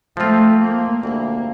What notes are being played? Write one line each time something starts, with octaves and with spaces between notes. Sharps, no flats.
F3 A3 C4 F4
A#3
D2 C3 F3 A3 A#3 E4